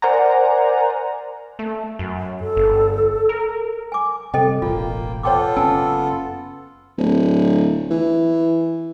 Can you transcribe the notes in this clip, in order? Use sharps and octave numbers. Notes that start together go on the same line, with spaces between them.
A#4 C5 D5 F#5 G#5 A#5
A3
F#2
A4
G1
A#4
G#5 D6
C3 G3 A4 D#5 G5
E1 A1 A#3 F4 G5
B3 F4 A4 C#5 G5 D6
F#1 C#4 G#5 A5 E6
D1
E3